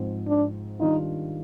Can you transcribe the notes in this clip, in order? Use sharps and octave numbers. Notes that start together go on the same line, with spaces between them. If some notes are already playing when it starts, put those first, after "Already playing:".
Already playing: G#2 F3 C4
D4
D#3 G3 D4 D#4 F4